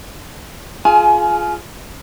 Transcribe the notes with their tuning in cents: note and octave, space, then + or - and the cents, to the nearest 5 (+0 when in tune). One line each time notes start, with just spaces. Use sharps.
F4 +0 G#4 +20 G#5 +35